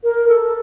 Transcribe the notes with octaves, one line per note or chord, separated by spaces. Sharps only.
A#4
A4